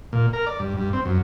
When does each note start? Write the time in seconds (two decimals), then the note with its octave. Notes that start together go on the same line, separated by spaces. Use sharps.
0.13 A#2
0.33 A#4
0.46 D5
0.59 G2
0.77 G2
0.93 C4
1.05 F#2